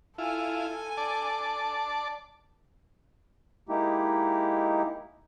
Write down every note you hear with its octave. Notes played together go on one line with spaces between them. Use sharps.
E4 F4 A4 G#5
D5 A5
G#3 A#3 D#4 E4 G4